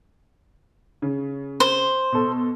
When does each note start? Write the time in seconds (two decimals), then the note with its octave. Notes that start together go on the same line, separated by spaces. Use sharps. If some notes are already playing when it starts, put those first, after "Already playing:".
1.02 C#3
1.60 C5
2.12 B2 A4